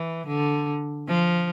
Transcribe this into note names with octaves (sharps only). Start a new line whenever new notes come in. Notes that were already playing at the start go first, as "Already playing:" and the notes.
Already playing: E3
D3
F3